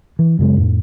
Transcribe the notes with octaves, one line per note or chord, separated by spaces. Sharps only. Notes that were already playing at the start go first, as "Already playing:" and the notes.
E3
F#2 C#3 G#3
F2 A2